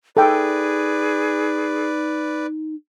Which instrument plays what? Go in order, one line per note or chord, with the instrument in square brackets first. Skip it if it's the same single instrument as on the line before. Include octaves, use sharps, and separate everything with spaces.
[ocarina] D#4 [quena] G#4 [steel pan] A4 G5 [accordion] B4 D5